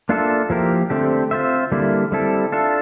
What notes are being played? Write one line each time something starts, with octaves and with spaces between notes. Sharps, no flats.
A#3 D4 F4 A4 E5
F3 A#3 E4 G4 A#4
D3 A3 C4 G4
C4 F4 C5 E5
D3 G3 A#3 E4
G3 C4 E4 A4
D4 F4 A4 E5